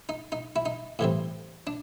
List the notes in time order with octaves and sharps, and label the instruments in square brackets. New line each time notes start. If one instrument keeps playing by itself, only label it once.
[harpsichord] D#4
D#4
E4
D#4
A2 E3 G3 C4
D4